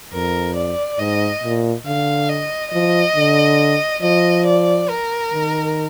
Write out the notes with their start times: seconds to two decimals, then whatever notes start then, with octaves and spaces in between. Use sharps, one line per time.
0.13 F2 A#4
0.56 D5
0.99 G#2 D#5
1.43 A#2
1.86 D3 F5
2.29 D#5
2.72 F3 D#5
3.16 D3
4.02 F3 D#5
4.46 D5
4.89 A#4
5.33 D#3